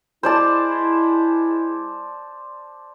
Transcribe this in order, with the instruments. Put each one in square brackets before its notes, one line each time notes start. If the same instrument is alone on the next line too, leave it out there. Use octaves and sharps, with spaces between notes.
[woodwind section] G#3 E4 [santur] C5 D5 A5